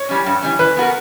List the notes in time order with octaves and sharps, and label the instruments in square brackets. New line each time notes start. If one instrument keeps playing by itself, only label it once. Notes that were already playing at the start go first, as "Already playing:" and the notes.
Already playing: [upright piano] C#5
[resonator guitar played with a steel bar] E3 G3 C#4
G2
E3 G3 C#4
[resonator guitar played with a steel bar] E3 [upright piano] B4
[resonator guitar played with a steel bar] B3 F#4 A#4